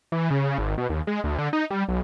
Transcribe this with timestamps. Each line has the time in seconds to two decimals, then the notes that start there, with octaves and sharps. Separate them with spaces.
0.12 E3
0.30 C#3
0.44 C#3
0.58 G#1
0.78 B2
0.89 D#2
1.07 G#3
1.24 D2
1.38 D3
1.53 D#4
1.71 G3
1.89 B1